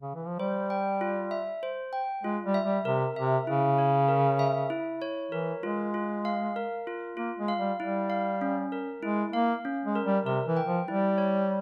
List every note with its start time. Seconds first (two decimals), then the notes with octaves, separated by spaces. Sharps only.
0.02 C#3
0.15 E3
0.26 F3
0.39 G3 C5
0.70 G5
1.01 F4
1.31 E5
1.63 C5
1.93 G5
2.24 G#3 F4
2.45 G3
2.54 E5
2.65 G3
2.85 C3 A#4
3.16 C3 E5
3.47 C#3 E4
3.78 C#5
4.08 A#4
4.39 E5
4.70 E4
5.02 C#5
5.32 E3 A#4
5.63 G#3 F4
5.94 F4
6.25 F5
6.56 A#4
6.87 F4
7.17 A#3 F4
7.39 G#3
7.48 F5
7.58 G3
7.79 G3 E4
8.10 F5
8.41 C#4
8.72 A#4
9.03 G#3 E4
9.33 A#3 F5
9.65 C#4
9.85 G#3
9.95 A#4
10.05 G3
10.26 C3 A#4
10.47 E3
10.57 G5
10.67 F3
10.87 G3 E4
11.18 C#5